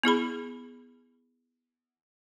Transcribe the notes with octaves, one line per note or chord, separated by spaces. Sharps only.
B3 E4 G#4 B5